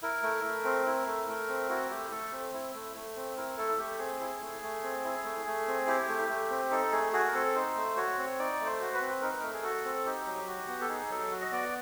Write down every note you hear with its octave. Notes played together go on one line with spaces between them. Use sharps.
E4 A#4
A3
A3
C4
E4
A3
A3
C4
E4 F#4
A3 G4
A3 A4
C4
E4
A3
A3
C4
E4 A#4
A3 A4
A3 G4
C4 G#4
E4
A3
A3
C4
E4
A3
A3
C4
E4 G4
A3
A3
C4
D#4 A4
A3 G#4
F#4 G#4
A#4
C4 A4
D#4 C5
A3
F#4 C#5
C4
D#4 D5
A3
C5
F#4
B4
C4
D#4 A#4
B4
A3 A#4
G#4
F#4 A4
C4
D#4 G4
F#3
F#4
B3
A4
D#4 G#4
F#3 A4
F#4
D#5
B3 D5